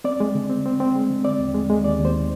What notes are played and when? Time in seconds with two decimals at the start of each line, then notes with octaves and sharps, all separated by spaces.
0.04 C4 D5
0.20 G#3
0.34 D3
0.49 C4
0.66 C4
0.80 C4
0.95 G#3
1.09 D3
1.24 C4 D5
1.39 D#2
1.54 G#3
1.70 G#3
1.84 D#2 D5
2.00 D#2 C5